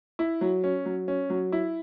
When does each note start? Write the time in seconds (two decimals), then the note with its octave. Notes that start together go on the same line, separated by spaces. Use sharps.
0.19 E4
0.41 F#3
0.64 C#4
0.86 F#3
1.08 C#4
1.30 F#3
1.52 E4